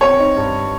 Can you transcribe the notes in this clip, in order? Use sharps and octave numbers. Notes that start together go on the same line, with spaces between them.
C4 C#5
D#4
G2